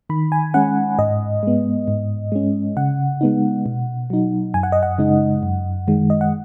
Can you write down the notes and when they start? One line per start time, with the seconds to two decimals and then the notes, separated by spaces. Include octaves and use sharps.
0.10 D#3 B5
0.32 G#5
0.54 G#3 C#4 F#5
0.99 G#2 D#5
1.43 G#3 B3
1.88 G#2
2.32 G#3 C#4
2.77 C#3 F#5
3.21 G#3 B3 D#4
3.66 B2
4.10 F#3 D#4
4.54 F#2 G#5
4.63 F#5
4.72 D#5
4.83 F#5
4.98 C#3 G#3 D#4
5.43 F#2
5.88 D#3 G#3
6.10 D#5
6.21 F#5